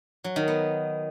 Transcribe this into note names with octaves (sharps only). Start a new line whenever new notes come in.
F#3
D#3
B3